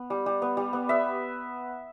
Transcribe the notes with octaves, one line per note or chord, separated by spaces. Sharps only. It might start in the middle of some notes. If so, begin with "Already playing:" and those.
Already playing: B3
G3
G3
B3
G3
B3
B3 E5